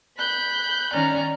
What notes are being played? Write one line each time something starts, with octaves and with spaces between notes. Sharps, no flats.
B5 F#6 G6
D#3 C#4 D5 A#5 F6